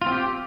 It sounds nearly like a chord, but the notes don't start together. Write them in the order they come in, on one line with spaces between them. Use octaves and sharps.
F4 C4 G4